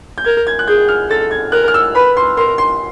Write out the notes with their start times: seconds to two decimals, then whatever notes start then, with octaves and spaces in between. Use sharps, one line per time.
0.18 G6
0.25 A#4 G#6
0.47 G#6
0.59 F#6
0.67 G#4 G6
0.88 F6
1.10 A4 A6
1.31 G#6
1.52 A#4 F#6
1.68 F6
1.74 E6
1.95 B4 B5
2.17 C6
2.37 A#4 C6
2.58 C6